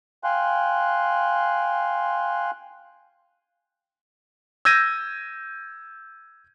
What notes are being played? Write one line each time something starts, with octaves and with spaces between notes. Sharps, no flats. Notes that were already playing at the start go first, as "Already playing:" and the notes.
F5 G5 G#5 C6 F#6
E6 G6 G#6 A#6 D#7